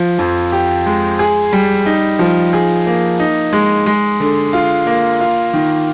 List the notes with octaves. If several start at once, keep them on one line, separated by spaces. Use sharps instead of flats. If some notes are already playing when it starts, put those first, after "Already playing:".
Already playing: F3
F2
G4
G#3
G#4
G3
D#4
F3
G#4
A#3
D#4
G#3
G#3
D3
F4
A#3
F4
D#3